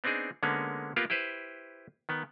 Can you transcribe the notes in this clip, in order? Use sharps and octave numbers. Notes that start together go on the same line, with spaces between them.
B3 C4 D4 D#4 G#4
D3 G#3 A#3 B3 C#4
A#3 B3 F4 G4 A#4
E4 G4 B4 C5
D#3 B3